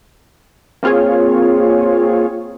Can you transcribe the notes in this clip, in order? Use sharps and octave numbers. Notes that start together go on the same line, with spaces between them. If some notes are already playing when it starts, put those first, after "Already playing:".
A#3 C4 F4 G#4 C#5